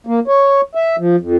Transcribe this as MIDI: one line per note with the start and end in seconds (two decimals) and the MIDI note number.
0.07 0.20 58
0.28 0.61 73
0.75 0.96 76
0.98 1.16 53
1.20 1.37 41